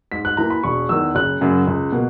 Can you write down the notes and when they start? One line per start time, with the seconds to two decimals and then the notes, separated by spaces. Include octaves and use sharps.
0.12 G#2 B6
0.25 F#6
0.37 E3 A#3 A#5
0.50 B5
0.63 E1 C#6
0.89 E2 D#3 E6
1.15 F#1 F#6
1.41 F#2 C#3 F#3
1.67 C#2
1.92 B2 A#3